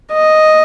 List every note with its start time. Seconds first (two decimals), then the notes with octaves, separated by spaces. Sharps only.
0.12 D#5